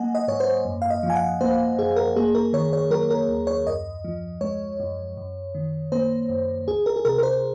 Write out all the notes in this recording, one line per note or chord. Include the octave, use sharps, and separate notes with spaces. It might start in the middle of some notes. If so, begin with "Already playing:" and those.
Already playing: F#3 A#3 D#5 F#5 G#5
D#5
G#2 C#5
C5
F#2
F5
D#5
F3
G#5
F#5
A#3 C5
F#2 G#4
A#4
A#3 G#4
A#4
D#3 C#5
C#5
F#3 A#4
A#4
D#2
C#5
F#2 D#5
F3
G#3 C#5
F#2
F#2
D#3
A#3 C5
F#2
C#2 G#4
A#4
G#4
C3 A#4
A#4
C5